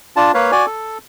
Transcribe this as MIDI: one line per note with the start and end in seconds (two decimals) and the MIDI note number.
0.16 0.32 62
0.16 0.32 65
0.16 0.32 81
0.34 0.51 58
0.34 0.51 71
0.34 0.51 73
0.34 0.51 77
0.52 0.66 66
0.52 0.66 74
0.52 0.66 80
0.66 0.98 69